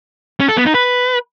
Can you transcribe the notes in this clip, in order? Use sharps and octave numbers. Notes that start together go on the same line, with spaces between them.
C#4
A4
B3
D#4
B4